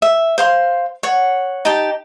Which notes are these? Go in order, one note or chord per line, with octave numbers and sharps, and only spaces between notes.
E5
C5 F5 C6
C#5 F#5
D#4 G4 G5 A5